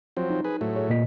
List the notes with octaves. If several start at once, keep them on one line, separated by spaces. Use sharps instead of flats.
F3 F#3 C4
D#4
G#4 B4
A2 F#3 A3
G#4 C#5
A#2 D#5 B6